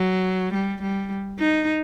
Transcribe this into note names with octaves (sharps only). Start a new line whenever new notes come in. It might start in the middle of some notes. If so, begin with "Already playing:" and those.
Already playing: F#3
G3
G3
D#4